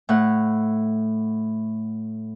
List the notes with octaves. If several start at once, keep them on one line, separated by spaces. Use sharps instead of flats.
A2 F#5